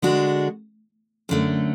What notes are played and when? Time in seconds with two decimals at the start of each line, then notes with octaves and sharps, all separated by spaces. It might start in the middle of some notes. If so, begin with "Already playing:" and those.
0.02 D3 G#3 D4 F#4
1.29 F#2 D3 A3